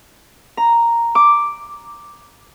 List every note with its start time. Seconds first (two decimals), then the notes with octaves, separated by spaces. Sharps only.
0.57 A#5
1.15 D6